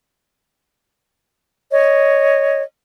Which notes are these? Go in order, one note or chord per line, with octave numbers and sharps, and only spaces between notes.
C#5 D#5